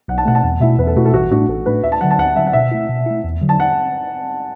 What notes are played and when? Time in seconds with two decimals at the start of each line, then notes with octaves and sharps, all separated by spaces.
0.08 B1 F#5
0.18 A5
0.26 B2 A3 F#5
0.35 A5
0.44 E2 F#5
0.60 B2 A3 E4 E5
0.79 E2 B4
0.87 A4
0.96 B2 A3 E4 F#4
1.05 A4
1.13 A1 F#4
1.31 A2 A3 D4 F#4
1.49 A1 A4
1.66 A2 A3 D4 B4
1.83 D2 E5
1.92 A5
2.01 D3 F#3 F#5
2.11 A5
2.19 D2 F#5
2.36 D3 F#3 E5
2.47 F#5
2.53 B2 E5
2.71 A3 E4
2.89 B2
3.06 A3 E4
3.24 E2
3.41 D3 F#3
3.49 A5
3.60 F#5